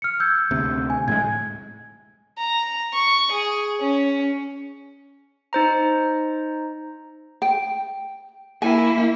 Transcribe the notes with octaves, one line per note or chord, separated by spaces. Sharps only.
F6 C#7
E6 G6 G#6
D2 C3
G#5
A2 G3 G#3 G#6
A#5
C#6
G#4
C#4
D#4 C5 A#5
G5
A#3 E4 G#5